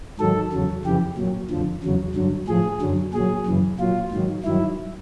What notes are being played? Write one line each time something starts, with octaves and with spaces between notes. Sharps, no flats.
G#2 D#3 F#3 A4
E2 C#3 F#3
F2 C#3 E3 G4
A#2 F#3
F2 D3 F3
E2 C#3 F#3
G2 D3 F#3
A2 F3 G#4
F#2 D3 F#3
A#2 F#3 G#4
F#2 C#3 E3
A#2 F#3 F4
G#2 D#3 F#3
G2 D#3 F#3 E4